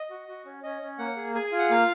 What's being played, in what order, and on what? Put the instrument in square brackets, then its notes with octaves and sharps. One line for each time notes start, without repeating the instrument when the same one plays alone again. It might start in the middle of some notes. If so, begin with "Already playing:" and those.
Already playing: [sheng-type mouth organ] D#5
F#4
F#4
C#4
C#4 D#5
C#4
A#3 F#5
G#4
G#4 G#5
G#5
F4
F#5
A#3 F5